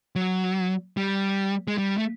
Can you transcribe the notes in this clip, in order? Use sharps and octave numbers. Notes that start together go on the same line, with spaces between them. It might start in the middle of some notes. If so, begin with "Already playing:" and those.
F#3
G3
G#3
G3
A3